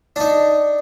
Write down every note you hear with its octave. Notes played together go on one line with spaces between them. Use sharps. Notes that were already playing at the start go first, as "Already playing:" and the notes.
D4 D#4